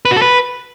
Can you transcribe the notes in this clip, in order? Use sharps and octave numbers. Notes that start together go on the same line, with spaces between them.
B4
F#4
A4
B4